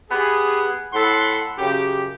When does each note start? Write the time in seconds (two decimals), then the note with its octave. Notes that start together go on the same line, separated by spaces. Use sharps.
0.10 B3 G4 G#4
0.93 A2 A4 F#5 B5 C6
1.59 F#2 C#3 G4